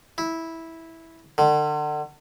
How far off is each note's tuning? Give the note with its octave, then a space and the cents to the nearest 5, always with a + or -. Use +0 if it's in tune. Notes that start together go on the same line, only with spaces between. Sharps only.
E4 -10
D3 +40